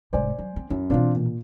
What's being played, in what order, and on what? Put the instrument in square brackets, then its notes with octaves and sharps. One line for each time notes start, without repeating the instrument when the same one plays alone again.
[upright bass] F1 G#2 [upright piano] C5 D5 G#5
[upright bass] F#3
C4
[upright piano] F#2 [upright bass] E4
[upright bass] B2 E3 [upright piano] C4 D4 F4
[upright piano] A#2